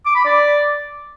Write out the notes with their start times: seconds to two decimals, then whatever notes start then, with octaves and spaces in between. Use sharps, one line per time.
0.06 D6
0.15 B5
0.25 D5